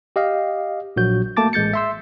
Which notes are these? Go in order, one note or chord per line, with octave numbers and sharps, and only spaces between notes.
G4 D#5 F5
A#1 F#3 F#4 G6
A3 A#3 A5 D6 A6
A1 G#3 G6 A6 C#7
E5 C6 E6